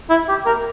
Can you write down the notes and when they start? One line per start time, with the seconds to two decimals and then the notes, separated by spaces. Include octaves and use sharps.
0.10 E4
0.29 G4
0.46 A#4